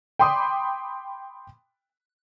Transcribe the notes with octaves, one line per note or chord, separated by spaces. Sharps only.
G5 B5 C6 D6 D#6